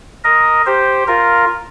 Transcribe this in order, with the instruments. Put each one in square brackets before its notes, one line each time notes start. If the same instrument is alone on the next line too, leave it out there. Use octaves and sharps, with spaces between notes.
[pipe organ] A#4 D#5
G4 C5
F4 A#4